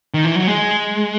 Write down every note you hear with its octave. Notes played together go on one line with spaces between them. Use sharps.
D#3
E3
F#3
G#3